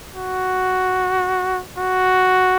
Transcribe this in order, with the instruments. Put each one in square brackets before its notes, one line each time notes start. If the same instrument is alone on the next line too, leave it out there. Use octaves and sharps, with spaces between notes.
[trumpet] F#4
F#4